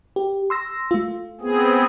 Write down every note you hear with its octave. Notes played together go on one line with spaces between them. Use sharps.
G4
C6 E6 A#6
A3 F4
B3 C4 G#4